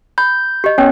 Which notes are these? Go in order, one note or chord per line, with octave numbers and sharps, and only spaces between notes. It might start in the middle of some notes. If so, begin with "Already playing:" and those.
B5 G6
G4 D#5
B3 C#4 C#5 G5